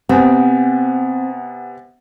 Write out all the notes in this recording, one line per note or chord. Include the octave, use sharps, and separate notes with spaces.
C3 B3 C4 F#5 G#5